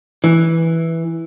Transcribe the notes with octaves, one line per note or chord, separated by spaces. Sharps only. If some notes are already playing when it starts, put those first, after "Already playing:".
E3